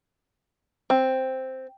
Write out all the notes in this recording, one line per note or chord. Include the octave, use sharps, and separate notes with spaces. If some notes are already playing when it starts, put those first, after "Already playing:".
C4